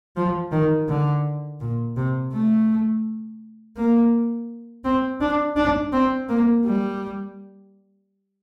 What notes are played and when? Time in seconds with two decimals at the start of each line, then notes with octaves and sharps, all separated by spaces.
0.16 F3
0.52 D#3
0.88 D3
1.60 A#2
1.96 C3
2.32 A3
3.77 A#3
4.84 C4
5.21 D4
5.56 D4
5.92 C4
6.29 A#3
6.65 G3